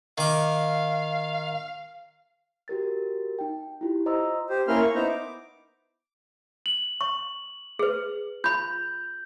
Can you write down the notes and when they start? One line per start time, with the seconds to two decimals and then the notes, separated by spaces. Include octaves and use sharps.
0.18 D#3 F5 D6
2.68 F#4 G4 A#4 A6
3.39 D#4 G5
3.81 E4 F4 G4
4.06 C5 D#5 A#5 C6 D#6 E6
4.48 G4 C5
4.68 A#3 C#4 E4 A#4 C6 F6
4.81 C#6
4.95 B3 D#4 E4 C5 A#5
5.08 D6
6.66 F#7
7.01 C#6
7.79 G#4 B4
8.44 F4 B5 G6